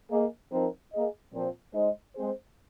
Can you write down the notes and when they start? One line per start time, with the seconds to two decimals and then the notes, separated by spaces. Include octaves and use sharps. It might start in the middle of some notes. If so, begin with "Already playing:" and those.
0.11 A#3 G#4 D#5
0.52 F3 C4 D#4 A#4
0.93 A#3 G#4 D#5
1.34 A#2 F3 C4
1.74 G#3 D#4 C5 D#5
2.15 G#3 C4 G#4 C5